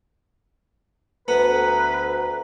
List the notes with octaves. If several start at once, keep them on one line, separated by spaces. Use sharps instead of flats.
D2 B3 B4 A#5